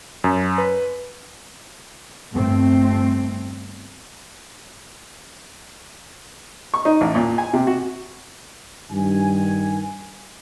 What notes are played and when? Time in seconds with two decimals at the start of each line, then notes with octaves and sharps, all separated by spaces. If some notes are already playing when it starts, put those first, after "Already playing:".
0.24 F#2
0.58 B4
2.33 G1 G2 A3 C4
6.74 C#6
6.85 D#4
7.01 A1
7.15 A#2
7.38 G#5
7.53 C3
7.67 F#4
8.91 G2 D#3 G#5